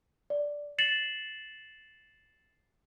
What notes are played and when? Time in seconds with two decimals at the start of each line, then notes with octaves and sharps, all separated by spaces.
0.30 D5
0.78 A6 C7 C#7 E7 F#7